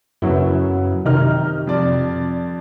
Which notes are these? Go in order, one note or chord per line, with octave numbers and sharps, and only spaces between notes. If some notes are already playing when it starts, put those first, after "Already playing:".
F#2 C#3 F#3 B3 E4
C3 D#3 D#4 F6
F2 D5